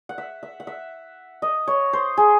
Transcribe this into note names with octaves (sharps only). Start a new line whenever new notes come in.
F#5
E5
E5
F#5
E5
D#5
C#5
C5
G#4